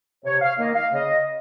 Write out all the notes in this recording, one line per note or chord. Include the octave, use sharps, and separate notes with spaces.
C3 C#5
F5
D#3 A#3 D#5
F5
C#3 D#5